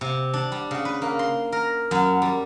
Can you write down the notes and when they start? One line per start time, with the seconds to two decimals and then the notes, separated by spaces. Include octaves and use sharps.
0.01 C3
0.34 D4
0.52 G3
0.71 C#3
0.85 B4
1.02 A#3
1.19 C6
1.52 A#4
1.91 F#2
2.22 G3